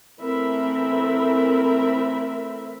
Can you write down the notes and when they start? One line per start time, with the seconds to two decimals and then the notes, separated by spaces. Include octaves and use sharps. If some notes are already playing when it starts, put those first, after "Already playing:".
0.21 E3 A3 C4 A#4 E5 B5